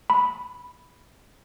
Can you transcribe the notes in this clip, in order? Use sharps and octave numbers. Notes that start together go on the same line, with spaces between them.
B5